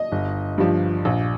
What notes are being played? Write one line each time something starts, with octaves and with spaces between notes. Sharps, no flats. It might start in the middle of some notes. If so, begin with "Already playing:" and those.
Already playing: D#5
G1
G2 F3
A#1